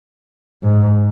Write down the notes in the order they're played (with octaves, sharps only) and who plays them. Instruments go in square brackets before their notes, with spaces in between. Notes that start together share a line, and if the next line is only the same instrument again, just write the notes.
[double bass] G#2